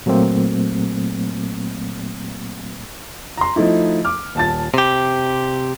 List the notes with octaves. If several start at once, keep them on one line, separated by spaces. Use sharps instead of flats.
A#2 F#3 A3 A#3 C4
A#5 C6
F3 A3 D#4 E4
D6 F6
D#1 A5 A6
C3 G4